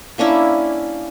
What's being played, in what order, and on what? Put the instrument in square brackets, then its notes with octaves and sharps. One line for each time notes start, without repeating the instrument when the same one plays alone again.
[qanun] A#3 C#4 D4 E4